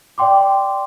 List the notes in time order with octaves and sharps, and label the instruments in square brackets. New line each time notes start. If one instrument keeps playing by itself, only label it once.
[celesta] D5 F5 G5 C6 D6